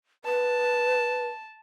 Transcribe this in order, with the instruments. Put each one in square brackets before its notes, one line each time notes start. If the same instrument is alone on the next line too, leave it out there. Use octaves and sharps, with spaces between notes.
[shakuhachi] B4 [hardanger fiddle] A5